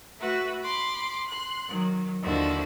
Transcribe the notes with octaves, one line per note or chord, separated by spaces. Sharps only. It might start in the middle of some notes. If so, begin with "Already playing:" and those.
A3 F#4 B4 E5
B5 C6 D6
C6 F#6
D#3 F#3
D#2 D3 F3 E4 F#4